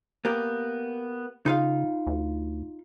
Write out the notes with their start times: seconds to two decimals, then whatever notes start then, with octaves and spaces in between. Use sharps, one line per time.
0.25 A#3 B3 G4
1.46 C#3 D#4 F4 F5
2.07 D2